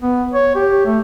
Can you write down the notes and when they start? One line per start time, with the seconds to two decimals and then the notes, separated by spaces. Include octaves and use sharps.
0.02 B3
0.34 C#5
0.55 G4
0.85 A3